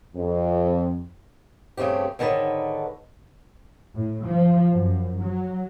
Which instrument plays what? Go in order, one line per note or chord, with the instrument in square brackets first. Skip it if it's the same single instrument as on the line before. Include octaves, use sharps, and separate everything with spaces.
[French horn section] F2
[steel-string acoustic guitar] G2 C#3 A3 C4 G4
G#2 D3 D#3 A4 B4 C#5
[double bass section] A2
F3
F#2
F#3